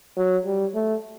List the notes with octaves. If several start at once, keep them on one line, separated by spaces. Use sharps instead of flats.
F#3
G3
A3